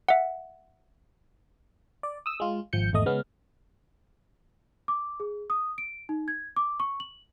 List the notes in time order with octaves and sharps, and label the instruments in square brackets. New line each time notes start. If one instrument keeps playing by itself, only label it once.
[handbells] E5 F#5
[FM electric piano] D5
D#6 E6
G#3 F4
G#1 F3 G6 C#7
G#1 E2 A3 D#5 D#6
C#3 G#3 B3 C#4 F6
[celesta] D6
G#4
D#6
D7
D#4
G#6
D6
C#6
F#7